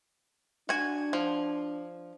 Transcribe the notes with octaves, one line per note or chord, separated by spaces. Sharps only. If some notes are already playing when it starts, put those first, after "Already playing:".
D4 F#4 G#5
F3